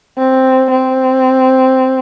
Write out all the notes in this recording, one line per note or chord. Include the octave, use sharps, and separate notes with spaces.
C4
C4